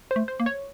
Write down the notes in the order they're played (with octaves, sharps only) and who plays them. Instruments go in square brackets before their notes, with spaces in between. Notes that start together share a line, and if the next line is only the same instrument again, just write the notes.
[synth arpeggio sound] C5
[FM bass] A3
[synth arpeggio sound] C5
[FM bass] A#3
[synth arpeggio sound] C#5